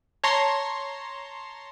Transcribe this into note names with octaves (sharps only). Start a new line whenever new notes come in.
C#5 A5 A#5 C6